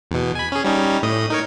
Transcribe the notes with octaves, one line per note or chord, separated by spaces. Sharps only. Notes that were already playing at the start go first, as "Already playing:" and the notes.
E2 B2
G#5 B5
C#4 G#4
G3 C#4 D#4
A2 D#5 D#6
D#4 A#4 C#5